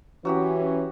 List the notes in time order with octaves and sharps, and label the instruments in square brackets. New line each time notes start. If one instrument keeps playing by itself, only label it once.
[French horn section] E3 C#4 [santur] F#3 F#4 G4